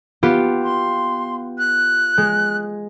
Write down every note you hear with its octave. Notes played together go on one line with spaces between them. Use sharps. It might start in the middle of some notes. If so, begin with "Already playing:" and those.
B3 F4 G4
C6
F#6
G#3